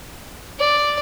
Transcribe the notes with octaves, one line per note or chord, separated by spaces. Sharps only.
D5